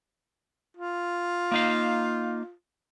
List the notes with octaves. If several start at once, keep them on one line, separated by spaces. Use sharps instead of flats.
F4
A#3 D#4 F5